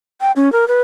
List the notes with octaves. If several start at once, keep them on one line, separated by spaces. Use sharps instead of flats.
G5
C#4
A#4
B4